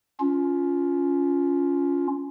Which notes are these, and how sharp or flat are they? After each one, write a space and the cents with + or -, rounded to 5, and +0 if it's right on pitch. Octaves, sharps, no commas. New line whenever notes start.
C#4 +20 F4 +0